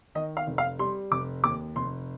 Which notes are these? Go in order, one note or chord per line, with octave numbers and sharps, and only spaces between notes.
D#3 D#5
F5
F1
F5
G3 C6
F1 D6
D#2 D6
F1 C6